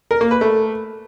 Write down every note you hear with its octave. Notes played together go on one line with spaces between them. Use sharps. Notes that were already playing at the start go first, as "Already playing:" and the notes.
A#4
A#3
B4
A3